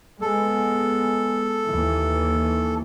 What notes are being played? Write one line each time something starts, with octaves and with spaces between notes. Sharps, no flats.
G#3 B3 A4
D#2 E3